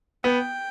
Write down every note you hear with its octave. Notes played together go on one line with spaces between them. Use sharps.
B3 G5